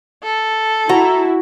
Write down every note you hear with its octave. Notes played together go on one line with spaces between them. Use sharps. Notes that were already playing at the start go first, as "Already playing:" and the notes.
A4
E4 F#4 A#5